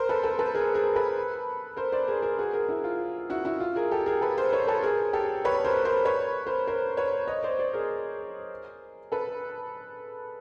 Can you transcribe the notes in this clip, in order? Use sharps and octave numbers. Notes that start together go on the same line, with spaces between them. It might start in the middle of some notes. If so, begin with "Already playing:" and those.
Already playing: A#4 C5
A4 B4
A4 B4
A4 B4
G#4 A#4
G#4 A#4
A4 B4
A#4 C5
C5 D5
G#4 A#4
G#4 A#4
F#4 G#4
G#4 A#4
E4
F4
E4 F#4
E4 F#4
F4
G#4 A#4
G4 A4
G#4 A#4
A4 B4
A#4 C5
B4 C#5
A4 B4
G#4 A#4
G4 A4
B4 C#5
A#4 C5
A#4 C5
B4 C#5
A#4 C5
A#4 C5
B4 C#5
C#5 D#5
C5 D5
C5 D5
G#4 A#4
A4 B4